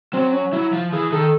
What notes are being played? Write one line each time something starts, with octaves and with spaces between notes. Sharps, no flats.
F#3 C4
C#4
F#3 E4
F3
E3 G#4
D#3 A4